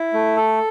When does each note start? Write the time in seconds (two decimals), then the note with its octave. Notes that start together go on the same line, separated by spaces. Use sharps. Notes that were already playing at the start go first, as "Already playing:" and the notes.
Already playing: E4
0.14 A3
0.37 A4